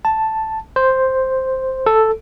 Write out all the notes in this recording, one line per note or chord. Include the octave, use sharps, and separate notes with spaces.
A5
C5
A4